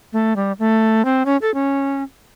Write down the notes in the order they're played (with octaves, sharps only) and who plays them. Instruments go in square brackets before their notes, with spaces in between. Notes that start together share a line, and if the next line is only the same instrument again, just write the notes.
[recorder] A3
G3
A3
C4
C#4
A4
C#4